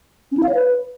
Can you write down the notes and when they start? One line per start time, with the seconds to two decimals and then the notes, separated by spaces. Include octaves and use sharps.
0.32 C#4
0.37 E4
0.43 F5
0.49 C#5
0.55 B4